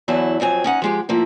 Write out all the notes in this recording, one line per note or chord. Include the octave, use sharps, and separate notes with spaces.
E2 E3 F#3 E4 A5
F2 F#3 C4 G#5
C#4 D#4 F#5
F3 G#3 G4
A2 F3 A#3 E4